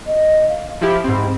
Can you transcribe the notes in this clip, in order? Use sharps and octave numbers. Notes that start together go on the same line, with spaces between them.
D#5
F5
F3 E4 G4 B5
G#2 C4